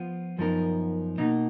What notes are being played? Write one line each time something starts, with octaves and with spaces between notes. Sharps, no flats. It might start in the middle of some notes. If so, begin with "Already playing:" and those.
Already playing: F3 B3 F4
F#2 F3 B3 D#4 A#4
B2 A#3 D#4